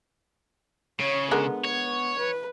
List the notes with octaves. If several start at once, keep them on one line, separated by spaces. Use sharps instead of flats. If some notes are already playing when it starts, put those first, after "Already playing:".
C#3 C#5
D3 G#3 B3 A#4
C#5
B4